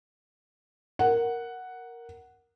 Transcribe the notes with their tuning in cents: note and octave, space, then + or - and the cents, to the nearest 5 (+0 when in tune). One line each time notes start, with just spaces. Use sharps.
A#4 +0 F#5 +0